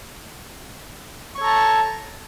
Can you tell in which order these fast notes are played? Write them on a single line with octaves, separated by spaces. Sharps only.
C#6 C#5 A4 A#5 A5